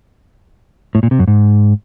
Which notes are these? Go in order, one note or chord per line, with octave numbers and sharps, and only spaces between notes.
A2
A#2
C3
F#2
G#2